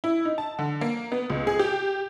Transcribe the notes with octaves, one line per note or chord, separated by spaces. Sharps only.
E4
D#4
A5
D3
A#3
B3
C#2
G#4
G4